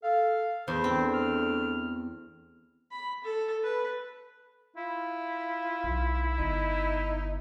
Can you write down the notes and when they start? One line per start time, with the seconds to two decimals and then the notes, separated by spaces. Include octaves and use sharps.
0.03 A4 F5
0.68 E2 C5
0.84 A3 C4 D4
1.14 F6
2.91 B5
3.24 A4
3.63 B4
4.76 E4 F4
5.83 B1
6.38 G1 D#4